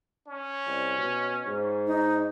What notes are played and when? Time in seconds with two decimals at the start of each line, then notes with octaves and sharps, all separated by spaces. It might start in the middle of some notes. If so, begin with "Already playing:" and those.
0.27 C#4
0.67 C2
0.98 B2
1.46 G#2
1.87 D#4